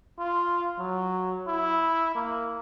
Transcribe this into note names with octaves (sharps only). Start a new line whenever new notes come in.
F4
F#3
E4
A#3